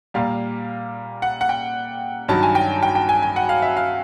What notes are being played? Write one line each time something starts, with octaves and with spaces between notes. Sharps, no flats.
A#2 G3 A#3 F5
F#5
F#5
G5
G2 D#3 F#3 A5
G#5
G5
G5
G5
G#5
G#5
F#5
F5
E5
F5